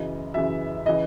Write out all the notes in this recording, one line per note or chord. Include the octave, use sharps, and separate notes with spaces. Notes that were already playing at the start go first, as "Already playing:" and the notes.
Already playing: F#2 C#3 E3 D#5
F#2 C#3 E3 E5
C#3 E3 D#5